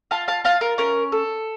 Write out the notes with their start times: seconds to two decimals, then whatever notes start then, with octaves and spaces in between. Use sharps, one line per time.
0.11 F4 F5 A5
0.28 F5 A5
0.44 F4 F5 A5
0.61 A#4
0.78 C#4 A#4
1.12 A4